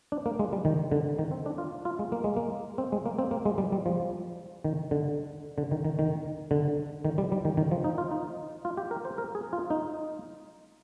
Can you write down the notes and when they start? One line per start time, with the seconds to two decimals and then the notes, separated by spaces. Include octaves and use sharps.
0.12 D4
0.26 A#3
0.39 G#3
0.53 G3
0.65 D#3
0.92 D3
1.19 D#3
1.31 C4
1.46 D4
1.58 F4
1.85 F4
1.99 G#3
2.12 A#3
2.24 G#3
2.37 A#3
2.78 C4
2.92 G#3
3.06 A#3
3.19 C4
3.31 A#3
3.45 G#3
3.58 G3
3.72 G3
3.86 F3
4.64 D#3
4.91 D3
5.58 D3
5.71 D#3
5.85 D#3
5.99 D#3
6.51 D3
7.05 D#3
7.18 G3
7.32 G3
7.45 D#3
7.57 D#3
7.71 F3
7.84 D#4
7.98 F4
8.11 D#4
8.65 F4
8.77 G4
8.91 A#4
9.05 C5
9.18 A#4
9.35 G#4
9.53 F4
9.70 D#4